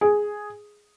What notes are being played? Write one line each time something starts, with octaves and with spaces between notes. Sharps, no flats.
G#4